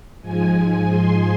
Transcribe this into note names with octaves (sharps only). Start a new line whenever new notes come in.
G#2 F3 G#3 G#5
C6